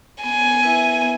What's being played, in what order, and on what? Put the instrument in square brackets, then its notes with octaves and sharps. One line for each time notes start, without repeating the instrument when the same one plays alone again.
[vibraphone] B3 [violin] G#5
[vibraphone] E4 B4 E5
B3